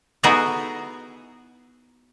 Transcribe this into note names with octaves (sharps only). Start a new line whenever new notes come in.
B3 D#4 E4 F#4 G#4 A4